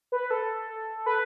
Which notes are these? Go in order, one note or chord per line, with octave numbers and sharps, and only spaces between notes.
B4
A4
B4